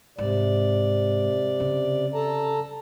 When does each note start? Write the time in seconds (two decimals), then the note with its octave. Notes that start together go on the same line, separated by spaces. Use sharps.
0.18 G#2 C3 D5
1.60 C#3
2.14 A4 A5 A#5